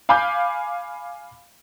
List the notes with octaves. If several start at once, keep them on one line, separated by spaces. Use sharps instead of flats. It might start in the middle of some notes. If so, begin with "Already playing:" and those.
F5 G#5 B5 D6 G6